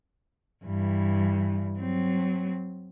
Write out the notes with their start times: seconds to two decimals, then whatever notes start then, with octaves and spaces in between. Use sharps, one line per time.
0.65 G2 E3
1.79 F#3 C4